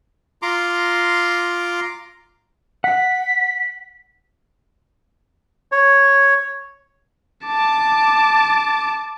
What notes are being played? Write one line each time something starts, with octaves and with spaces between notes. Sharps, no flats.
F4 A#5 C6 D6
F#5 B6
C#5
A5 D6